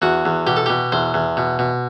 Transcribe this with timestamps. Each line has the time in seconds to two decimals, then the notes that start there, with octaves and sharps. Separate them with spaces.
0.02 E2 F#4
0.25 E2
0.47 B2 G4
0.57 A4
0.66 B2 G4
0.92 E2 C5
1.14 E2
1.37 B2
1.59 B2